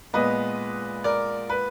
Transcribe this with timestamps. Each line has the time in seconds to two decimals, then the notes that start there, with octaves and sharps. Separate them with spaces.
0.13 A#2 G#3 B3 B4 D#5
1.04 A#4 D5
1.50 B4